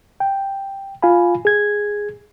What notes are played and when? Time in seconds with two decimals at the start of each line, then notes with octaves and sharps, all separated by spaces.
0.20 G5
1.02 F4 F5 G#5 B5
1.45 G#4 G#6